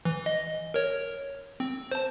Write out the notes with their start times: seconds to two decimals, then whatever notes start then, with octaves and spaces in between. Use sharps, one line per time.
0.05 E3
0.26 D#5
0.74 A#4 C#5
1.60 C4
1.91 C5 A5